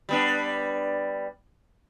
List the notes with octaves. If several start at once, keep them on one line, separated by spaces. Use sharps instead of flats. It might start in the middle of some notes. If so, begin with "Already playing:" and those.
G3 B3 D4